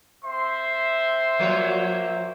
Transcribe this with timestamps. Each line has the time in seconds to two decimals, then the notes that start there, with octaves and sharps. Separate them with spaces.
0.24 C4 C5 E5 C6
1.39 F3 A#3 C#5